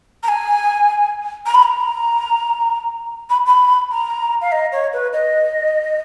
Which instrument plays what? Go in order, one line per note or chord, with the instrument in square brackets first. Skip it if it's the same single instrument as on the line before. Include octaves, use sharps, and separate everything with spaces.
[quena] A#5
G#5
A#5
B5
A#5
B5
B5
A#5
F5
D#5
C#5
B4
D#5